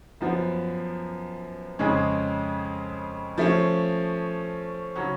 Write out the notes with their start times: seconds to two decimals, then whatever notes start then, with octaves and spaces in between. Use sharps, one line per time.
0.21 F#2 F3 B3
1.79 F2 C#3 G#3 C#4 G#4
3.37 F3 A3 C#4
4.96 C#3 F#3 C#4